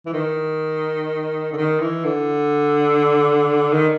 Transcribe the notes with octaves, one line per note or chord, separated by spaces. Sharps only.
E3
D#3
D3
D#3
E3
D3
D#3